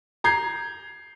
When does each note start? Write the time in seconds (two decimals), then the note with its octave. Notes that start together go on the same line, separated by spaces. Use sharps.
0.24 A#5 G6 G#6 C7